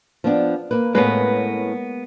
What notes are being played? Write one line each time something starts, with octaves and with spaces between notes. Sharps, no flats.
F3 B3 D4
A#3 B4
A2 G#3 A#3 B3 C#4 B4